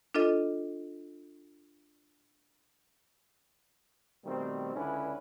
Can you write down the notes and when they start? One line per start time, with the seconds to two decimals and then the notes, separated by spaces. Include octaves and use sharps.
0.15 D4 F4 A4 D#5
4.24 B2 D#3 G3 A3 C4
4.75 C#2 D3 C#4 D4 E4 B4